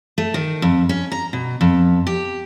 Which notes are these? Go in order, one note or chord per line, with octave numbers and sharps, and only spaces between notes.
A3
D#3
F2
C#4
A#5
B2
F2
G4